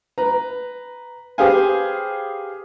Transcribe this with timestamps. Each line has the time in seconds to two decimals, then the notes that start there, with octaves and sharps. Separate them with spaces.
0.18 B4 A#5
1.38 G4 G#4 B4 C5 F5 G#5